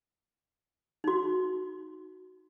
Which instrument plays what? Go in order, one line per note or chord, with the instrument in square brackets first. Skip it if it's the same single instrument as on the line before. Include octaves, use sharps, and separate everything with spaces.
[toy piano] D#4 F#4